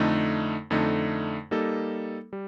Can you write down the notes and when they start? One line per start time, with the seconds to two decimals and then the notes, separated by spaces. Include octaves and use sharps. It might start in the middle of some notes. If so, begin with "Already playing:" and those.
Already playing: F2 D3 A3 D#4
0.70 F2 D3 A3 D#4
1.51 G3 A#3 D#4 A4
2.33 G3